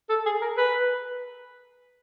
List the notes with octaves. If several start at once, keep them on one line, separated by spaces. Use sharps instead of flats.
A4
G#4
A#4
B4